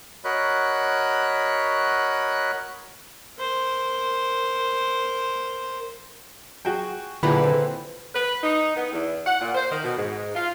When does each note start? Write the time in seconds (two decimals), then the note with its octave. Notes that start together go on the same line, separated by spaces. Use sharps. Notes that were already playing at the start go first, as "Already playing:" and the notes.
0.25 F#4 A#4 C#5 D#5 B5 F#6
3.39 A#4 C5
6.65 F#4 G#4 G5
7.23 A#2 D3 E4 G4 G#4 B4 F#5
7.43 C4
8.15 B4
8.43 D#4
8.76 B3
8.92 E2
9.27 F#5
9.40 A#2
9.54 C5
9.71 D#3
9.84 B2
9.98 G#2
10.35 F4